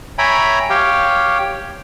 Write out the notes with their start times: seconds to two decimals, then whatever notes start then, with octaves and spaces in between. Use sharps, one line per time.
0.18 C#5 E5 G5 G#5 A#5 B5
0.70 G4 C#5 F5 G5